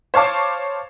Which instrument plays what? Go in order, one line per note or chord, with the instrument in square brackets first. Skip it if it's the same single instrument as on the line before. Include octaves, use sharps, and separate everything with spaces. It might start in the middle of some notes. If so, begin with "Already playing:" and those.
[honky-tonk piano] C5 C#5 F5 A5 D6